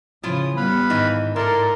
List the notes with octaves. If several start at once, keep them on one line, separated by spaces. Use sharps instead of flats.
C#3 F3 E4 F4 D#6
G3 B3 B4 F5 B5
G#2 D#3 E3 D#4
E4 A4 A#4 D5 C6